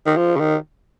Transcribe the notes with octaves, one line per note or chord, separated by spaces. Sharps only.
D#3
F3
C#3
D#3